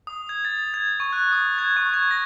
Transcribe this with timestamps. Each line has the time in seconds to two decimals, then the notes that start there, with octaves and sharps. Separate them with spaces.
0.07 D#6
0.29 G#6
0.45 A6
0.74 G#6
1.00 C#6
1.13 F#6
1.32 D#6
1.58 G#6
1.76 C#6
1.94 G#6
2.11 A#6